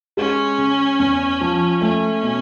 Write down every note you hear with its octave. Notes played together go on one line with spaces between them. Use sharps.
G#3 C#4
C#3
E2
F3
A3 C#4
B2